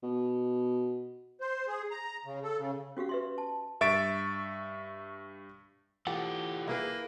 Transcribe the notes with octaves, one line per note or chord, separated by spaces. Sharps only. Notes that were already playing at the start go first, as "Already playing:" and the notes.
B2
C5
G#4
A#5
C#3
A4
C#3
C#4 F#4 G4 F5
B4 E5 C6
A5
G2 E5 C#6 A6 D7
E3 F4 G4 A4 F#5
A#3 E4 G#4 B4